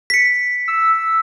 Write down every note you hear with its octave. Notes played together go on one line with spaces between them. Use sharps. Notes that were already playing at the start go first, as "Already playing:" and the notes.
B6 C#7
E6